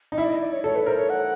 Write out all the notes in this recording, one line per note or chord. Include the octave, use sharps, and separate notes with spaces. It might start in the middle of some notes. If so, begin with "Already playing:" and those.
D#4
E4 E5
D5
D#5
D5
C#5
A4 C#5
B4
A#4 C5
C#5
F#5